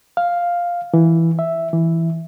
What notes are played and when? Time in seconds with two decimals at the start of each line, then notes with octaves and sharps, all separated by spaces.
0.17 F5
0.94 E3
1.39 E5
1.73 E3